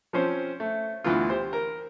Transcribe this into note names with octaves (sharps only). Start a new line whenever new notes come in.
F3 C4 C#4 C5
A3
D2 E3 B3 F4
G4 C5
A#4